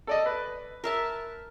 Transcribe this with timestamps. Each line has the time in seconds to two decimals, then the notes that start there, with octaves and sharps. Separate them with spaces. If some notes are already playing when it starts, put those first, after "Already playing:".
0.07 A4 D5 D#5
0.26 B4
0.84 A#4 E5 A5